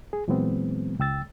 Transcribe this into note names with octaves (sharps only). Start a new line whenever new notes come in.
G#4
A#2 E3 F#3 G#3 B3 C4
C#2 G5 E6 A6